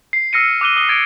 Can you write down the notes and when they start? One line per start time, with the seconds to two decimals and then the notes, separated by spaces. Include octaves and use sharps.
0.13 C7
0.33 E6 F6 A#6 C7 C#7 D#7
0.61 D6 E6 F#6 D#7 G7
0.76 D#6 G7
0.89 D6 G#6 A6 D7